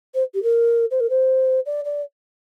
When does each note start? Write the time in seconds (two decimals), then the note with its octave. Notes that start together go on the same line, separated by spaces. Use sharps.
0.14 C5
0.34 G4
0.43 A#4
0.91 C5
1.00 A#4
1.09 C5
1.66 D5
1.85 D5